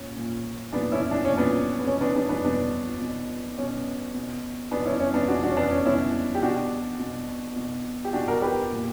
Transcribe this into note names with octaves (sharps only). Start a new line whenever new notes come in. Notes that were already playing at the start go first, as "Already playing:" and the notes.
Already playing: A#2 C#4
A#2
A#2 B3 D4
C#4 E4
D4
A#2 C#4
B3 D4
B3
B2 C#4
B3 D4
B3 D4
B3 D4
B2 B3 D4
B2
B2 C#4
B2
B2 B3 D4
C#4 E4
C#4
B3 D4
B2 D4 F#4
D4 F#4
C#4
B3 D4
C#4
B2 C#4 E4
G4
B2 D4 F#4
B2
B2
G4
B2 D4 F#4
F#4 A#4
G4 B4
A#2